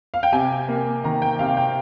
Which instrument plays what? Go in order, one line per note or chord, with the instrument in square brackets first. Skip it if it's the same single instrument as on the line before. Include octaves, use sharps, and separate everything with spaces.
[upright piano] F5
G5
C3 G#5
A#3
D#3 A#5
G5
C3 F5
G5